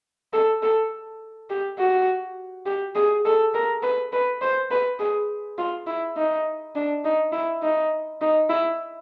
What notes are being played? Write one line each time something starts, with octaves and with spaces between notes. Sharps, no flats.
A4
A4
G4
F#4
G4
G#4
A4
A#4
B4
B4
C5
B4
G#4
F4
E4
D#4
D4
D#4
E4
D#4
D#4
E4